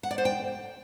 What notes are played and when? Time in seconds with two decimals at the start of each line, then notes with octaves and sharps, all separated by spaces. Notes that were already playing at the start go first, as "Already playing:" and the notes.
0.03 F#5
0.11 D5
0.18 C5
0.25 G5